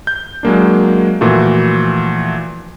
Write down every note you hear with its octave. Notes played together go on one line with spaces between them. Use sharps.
G6
F#3 G#3 A#3 D4
A#2 E3 F3 A3 F#4